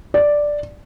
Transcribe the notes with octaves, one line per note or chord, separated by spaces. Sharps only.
D5